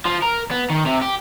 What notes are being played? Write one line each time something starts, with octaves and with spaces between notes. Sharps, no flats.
F3
A#4
B3
D#3
C3
G4